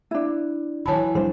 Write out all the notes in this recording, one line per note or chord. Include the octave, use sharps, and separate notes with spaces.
D4 E4
E3 F#3 C#5 A5 B5
F3 G3 D4 C5